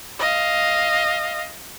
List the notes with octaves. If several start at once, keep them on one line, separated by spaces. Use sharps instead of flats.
D#5 F5